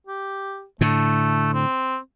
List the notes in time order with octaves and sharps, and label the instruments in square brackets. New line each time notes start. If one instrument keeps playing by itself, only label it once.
[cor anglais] G4
[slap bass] A2 D3 [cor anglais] A3
[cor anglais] C4